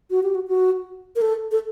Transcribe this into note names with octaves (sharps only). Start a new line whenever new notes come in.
F#4
G4
F#4
F#4
A#4
A4
A4